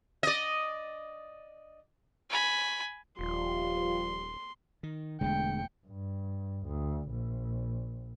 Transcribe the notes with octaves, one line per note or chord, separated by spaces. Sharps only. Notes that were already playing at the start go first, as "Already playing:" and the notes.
D5 D#5
G#5 B5
D#1 F3 G3 F4 C6
D#3
E1 E2 D3 G#3 A3 G5 C#7
G2
D2
A#1